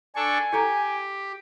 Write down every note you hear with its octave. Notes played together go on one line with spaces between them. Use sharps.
D4 A4 G#5 C#6
E4 G4 A4 A#5